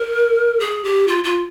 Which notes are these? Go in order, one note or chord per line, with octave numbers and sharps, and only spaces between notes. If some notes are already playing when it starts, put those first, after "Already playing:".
Already playing: A#4
G#4
G4
F4
F4